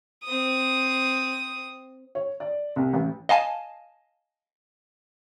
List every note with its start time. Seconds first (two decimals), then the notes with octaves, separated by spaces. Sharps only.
0.24 C4 D#6
2.15 C#5
2.40 D5
2.76 C2
2.93 A1
3.29 D#5 F5 G#5 A5